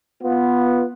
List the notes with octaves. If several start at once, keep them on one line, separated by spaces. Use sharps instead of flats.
B3 F4